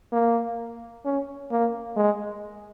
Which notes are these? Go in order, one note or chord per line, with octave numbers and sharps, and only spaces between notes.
A#3
C#4
A#3
G#3